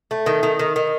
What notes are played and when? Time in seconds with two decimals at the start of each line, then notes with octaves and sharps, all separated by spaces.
0.11 A3
0.26 D#3
0.43 D#3
0.59 D#3
0.76 D#3